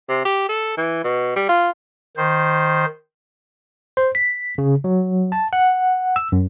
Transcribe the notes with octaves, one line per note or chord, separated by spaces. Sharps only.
C3
G4
A4
E3
B2
G3
F4
D#3 C5
C5
B6
C#3
F#3
A5
F#5
E6
F#2